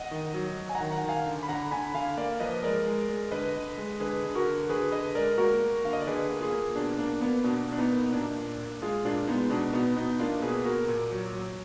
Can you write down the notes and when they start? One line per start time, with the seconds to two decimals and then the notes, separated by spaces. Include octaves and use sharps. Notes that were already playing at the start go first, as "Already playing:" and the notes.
Already playing: D#5 F#5
0.11 D#3
0.34 F#3
0.57 F#3
0.69 G#5
0.75 F#5 A#5
0.81 D#3
0.91 F#5 A#5
1.03 D#3
1.09 F5 G#5
1.26 D3
1.43 B5
1.48 D3 F#5 A#5
1.71 D3 G#5 B5
1.94 D3 F5 G#5
2.17 A#3 D5 F5
2.40 F3 B4 D#5
2.63 G#3 A#4 D5
2.86 G#3
3.09 G#3
3.31 D3 B4 D#5
3.55 D3
3.78 G#3
4.00 D3 G#4 B4
4.24 D3
4.35 F#4 A#4
4.46 D3
4.69 D3 G#4 B4
4.92 D3 B4 D#5
5.15 G#3 A#4 D5
5.38 A#3 F#4 A#4
5.60 A#3
5.84 D3 F5
5.93 D#5
6.00 D5
6.07 D3 G#4 B4
6.30 A#3
6.41 F4 G#4
6.52 A#3
6.76 B2 D4
6.98 A#3 D4
7.21 A#3 B3
7.44 B2 D4
7.68 B2 D4
7.78 B3 D#4
7.90 A#3
8.12 A#2 D4
8.36 A#2
8.58 A#2
8.82 G#3 F4 G#4
9.05 A#2 D4 F4
9.28 G#3 B3 D#4
9.50 B2 D4
9.73 B2 B3 D#4
9.96 B2 B3 D#4
10.19 A#3 D4 F4
10.42 B2 G#4 B4
10.64 A#3 F#4 A#4
10.88 A#2
11.11 F#3
11.33 F#3